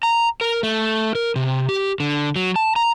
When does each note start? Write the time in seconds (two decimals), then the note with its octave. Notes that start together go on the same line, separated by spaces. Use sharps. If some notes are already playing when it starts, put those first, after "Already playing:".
0.03 A#5
0.41 A#4
0.63 A3
1.15 A#4
1.36 C3
1.69 G4
2.00 D3
2.36 F#3
2.56 A5
2.76 A#5